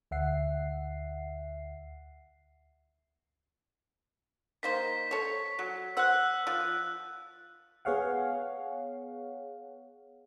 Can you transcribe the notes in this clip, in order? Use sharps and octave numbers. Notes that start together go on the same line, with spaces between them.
D2 E5 F#5 C7
D#3 A#3 C5 B6
A4 C#5
F#3
C5 F#5 E6 F#6
F3
B3 G#4 C#5 F5 F#5